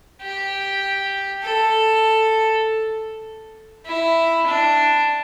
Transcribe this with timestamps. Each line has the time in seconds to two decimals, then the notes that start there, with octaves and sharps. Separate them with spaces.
0.21 G4
1.43 A4
3.86 E4
4.46 D4